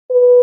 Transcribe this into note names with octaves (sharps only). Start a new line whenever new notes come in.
B4